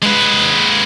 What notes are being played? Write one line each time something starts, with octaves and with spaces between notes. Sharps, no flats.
G#3 B4